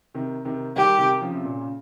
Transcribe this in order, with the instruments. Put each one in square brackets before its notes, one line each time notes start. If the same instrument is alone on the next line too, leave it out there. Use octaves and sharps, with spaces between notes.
[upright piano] C3 D#3
C3 D#3
[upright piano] D#3 G3 [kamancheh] G4
[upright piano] C3 D#3
C#3 F3
C3
A#2 C#3
C#3